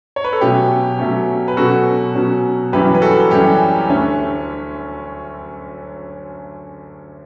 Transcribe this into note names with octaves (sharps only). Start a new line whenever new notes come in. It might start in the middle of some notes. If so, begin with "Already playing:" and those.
C#5
B4
A4
B2 F#3 A3 C#4 G4
B2 F#3 A3 C#4
B4
B2 F#3 C#4 F#4 A4
B2 F#3 C#4
F#2 E3 G3 C#4 G4 B4
B4
F#4 A4
A4
F#2 E3 G3 C#4 G4
D2 D3 A3 C#4